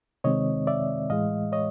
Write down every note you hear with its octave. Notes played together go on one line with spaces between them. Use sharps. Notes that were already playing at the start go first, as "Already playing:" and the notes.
C3 D#3 G#3 C4 C#5 D#5
D5 E5
A2 E3 G#3 D#5 F5
C#5 D#5